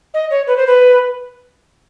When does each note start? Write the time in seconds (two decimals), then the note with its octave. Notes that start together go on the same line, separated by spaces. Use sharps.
0.14 D#5
0.31 C#5
0.47 B4
0.57 C5
0.67 B4